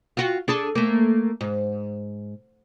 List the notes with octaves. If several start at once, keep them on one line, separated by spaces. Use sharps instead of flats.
F4 F#4
D4 G#4 A4
A3 A#3
G#2